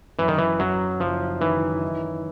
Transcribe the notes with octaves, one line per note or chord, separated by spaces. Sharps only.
F#2 E3
D#3
E3
F#2 F#3
F#1 F3
D#3 E3
D#4